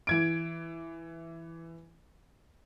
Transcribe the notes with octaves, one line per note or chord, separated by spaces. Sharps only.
E3 G#6 D7